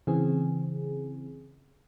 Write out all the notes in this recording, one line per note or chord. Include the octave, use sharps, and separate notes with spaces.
C#3 E3 C4 G#4